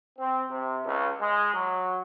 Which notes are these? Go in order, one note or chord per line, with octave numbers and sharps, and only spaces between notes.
C4
C3
C#2
G#3
F#3